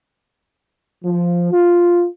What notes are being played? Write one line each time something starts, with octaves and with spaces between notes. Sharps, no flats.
F3
F4